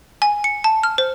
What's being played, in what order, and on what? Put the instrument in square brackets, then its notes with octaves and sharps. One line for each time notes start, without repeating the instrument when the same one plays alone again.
[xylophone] G#5
C#7
A5
F6
C5